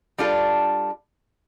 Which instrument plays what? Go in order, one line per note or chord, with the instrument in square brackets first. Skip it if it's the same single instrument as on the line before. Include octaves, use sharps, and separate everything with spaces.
[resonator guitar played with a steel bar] G3 D4 F4 A4